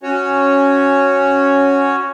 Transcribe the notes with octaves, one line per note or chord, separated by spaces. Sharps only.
C#4 F#4 C#5